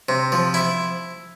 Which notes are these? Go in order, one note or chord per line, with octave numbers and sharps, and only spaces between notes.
C3
F3
E4